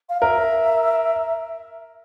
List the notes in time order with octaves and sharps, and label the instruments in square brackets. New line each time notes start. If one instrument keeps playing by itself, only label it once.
[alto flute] F5
[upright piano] A#4 [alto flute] E5